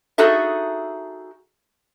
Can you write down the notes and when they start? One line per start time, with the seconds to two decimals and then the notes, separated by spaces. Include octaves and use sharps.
0.18 D#4 F#4 G#4 A4 E5